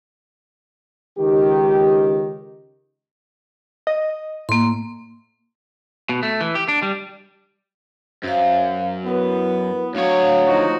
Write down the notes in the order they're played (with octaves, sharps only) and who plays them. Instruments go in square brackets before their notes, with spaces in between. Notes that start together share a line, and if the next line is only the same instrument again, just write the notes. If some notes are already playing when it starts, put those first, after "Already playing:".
[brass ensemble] C#2 D#3 G4
[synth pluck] D#5
[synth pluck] A2 [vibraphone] A#3 C6
[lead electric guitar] B2
A3
E3
G4
D4
G3
[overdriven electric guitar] F#2 [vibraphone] C5 F5
[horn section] B3 [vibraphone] E4 A#4 B4
[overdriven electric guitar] D2 C#5 [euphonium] F#3 [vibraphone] F5 D#6
[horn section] F3 D#4 F#4